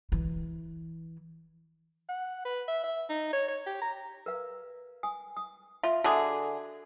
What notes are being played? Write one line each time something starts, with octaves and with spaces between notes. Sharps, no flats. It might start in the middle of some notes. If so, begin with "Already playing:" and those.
E3 E4
F#5
B4
E5
E5
D#4
C#5
C#5
G4
A#5
A#4 B4 F5
G#5 D#6
D#6
F4 E5 F5
D3 F#4 G#4 A4 E5